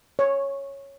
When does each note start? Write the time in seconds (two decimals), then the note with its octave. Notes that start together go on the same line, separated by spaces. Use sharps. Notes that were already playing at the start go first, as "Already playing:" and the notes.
0.19 C#5